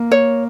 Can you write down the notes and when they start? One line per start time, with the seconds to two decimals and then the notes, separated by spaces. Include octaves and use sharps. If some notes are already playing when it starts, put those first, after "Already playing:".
Already playing: A#3
0.11 C#5